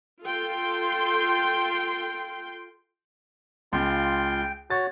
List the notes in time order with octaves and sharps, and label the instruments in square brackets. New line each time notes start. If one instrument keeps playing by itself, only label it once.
[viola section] F4 A4 G5 C6
[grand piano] C#2 [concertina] F4 C6 [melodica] G5
[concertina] F#4 C#5 [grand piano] A6